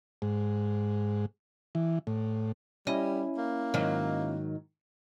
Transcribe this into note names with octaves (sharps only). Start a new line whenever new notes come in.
G#2
E3
A2
G3 C#4 E4 D#5
A#3
G#2 D#3 F#3